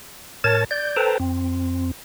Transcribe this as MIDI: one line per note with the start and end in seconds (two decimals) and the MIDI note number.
0.44 0.64 45
0.44 0.64 70
0.44 0.64 73
0.44 0.64 81
0.44 0.64 93
0.71 0.96 74
0.71 0.96 91
0.96 1.18 69
0.96 1.18 71
0.96 1.18 72
0.96 1.18 79
0.96 1.18 81
0.96 1.18 82
1.20 1.91 41
1.20 1.91 60